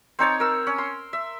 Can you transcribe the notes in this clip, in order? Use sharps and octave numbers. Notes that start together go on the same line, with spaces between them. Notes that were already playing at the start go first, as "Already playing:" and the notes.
C4 D#4 C#5 A5
A#4 E6
C#4
C6
E5